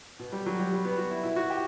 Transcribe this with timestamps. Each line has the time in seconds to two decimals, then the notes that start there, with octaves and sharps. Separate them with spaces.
0.19 B2
0.32 G3
0.46 F#3
0.59 G3
0.73 G3
0.85 B3
0.98 F#4
1.11 E4
1.23 B2 E4
1.36 F#4
1.50 G4